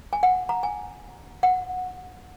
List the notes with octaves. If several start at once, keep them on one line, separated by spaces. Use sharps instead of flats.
G#5
F#5
A#5
G#5
F#5